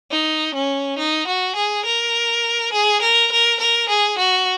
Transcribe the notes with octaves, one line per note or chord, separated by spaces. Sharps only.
D#4
C#4
D#4
F#4
G#4
A#4
G#4
A#4
A#4
A#4
G#4
F#4